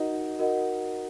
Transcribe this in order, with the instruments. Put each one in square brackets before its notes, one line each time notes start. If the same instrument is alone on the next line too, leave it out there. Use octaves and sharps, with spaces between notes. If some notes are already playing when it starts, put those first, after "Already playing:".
Already playing: [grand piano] D#4 [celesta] F#4 A#4 D#5 F#5
[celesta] F#4 A#4 D#5 F#5